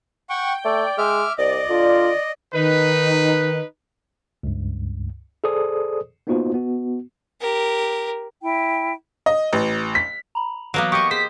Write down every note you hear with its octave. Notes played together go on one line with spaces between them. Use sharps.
F#5 G5 C#6
A3 D5
G#3 E5 D6 F6
C2 D5 D#5
D3 F4
D#3 D#4 B4
C#2 G2
G#4 A4 C5 D5 D#6
A#3 B3 D#4 F4 F#4 C5
B3 F#4
G4 A#4
E4 G5
D#5
A1
B6
A#5 B5
E3 F#3 A#3 B3 C7 D7
G4 D#5 C#6 D#6 G6
G#4 C5 B6